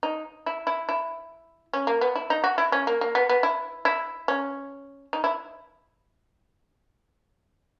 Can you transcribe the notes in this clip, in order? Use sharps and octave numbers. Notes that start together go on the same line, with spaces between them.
D#4
E4
E4
E4
C#4
A#3
B3
E4
D#4
F#4
E4
C#4
A#3
A#3
B3
B3
E4
E4
C#4
D#4
E4